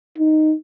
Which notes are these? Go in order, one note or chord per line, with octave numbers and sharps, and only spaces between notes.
D#4